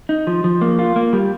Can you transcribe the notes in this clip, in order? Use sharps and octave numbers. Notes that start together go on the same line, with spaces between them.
D#4
F3
F3
A#3
F4
A#3
G3